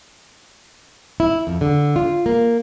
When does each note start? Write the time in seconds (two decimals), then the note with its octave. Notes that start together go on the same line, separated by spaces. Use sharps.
1.20 E4
1.47 F2
1.61 D3
1.96 F4
2.26 A#3